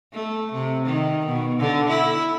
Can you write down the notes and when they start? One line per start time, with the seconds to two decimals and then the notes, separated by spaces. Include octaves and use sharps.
0.13 A3
0.52 C3
0.86 D#3
1.26 B2
1.59 D3
1.89 E4